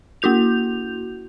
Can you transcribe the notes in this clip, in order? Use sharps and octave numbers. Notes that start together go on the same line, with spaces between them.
A#3 E4 F#4 G6 F7